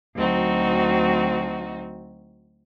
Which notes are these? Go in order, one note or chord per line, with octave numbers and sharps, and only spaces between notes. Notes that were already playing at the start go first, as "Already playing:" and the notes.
D2 F#3 C4 D#4 F#4